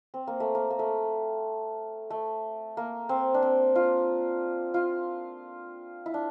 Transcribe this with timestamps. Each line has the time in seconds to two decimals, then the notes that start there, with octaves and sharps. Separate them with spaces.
0.14 C4
0.27 A#3
0.40 A3
0.55 A#3
0.70 A#3
0.79 A3
2.10 A3
2.77 A#3
3.09 C4
3.34 D4
3.42 C4
3.75 F4
4.74 F4
6.06 E4
6.14 D4